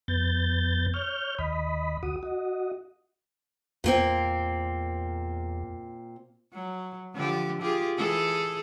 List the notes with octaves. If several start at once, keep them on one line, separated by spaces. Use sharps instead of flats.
F2 B3 G6 A6
C#5 F6 G6
D#2 D#5 B5
D2 F#4 D#6
F#4 D#5
E2 A#2 A#3 C4
F#3
D3 F3 G4
F4 G4 G#4
E3 G#4 A4